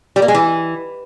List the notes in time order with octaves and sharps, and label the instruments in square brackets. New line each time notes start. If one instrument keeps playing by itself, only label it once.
[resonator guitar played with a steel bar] G3
A#3
G#3
E3